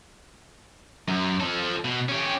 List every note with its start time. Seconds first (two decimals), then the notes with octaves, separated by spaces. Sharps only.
1.08 F#2
1.40 F3 A4
1.84 B2
2.09 C#4 G4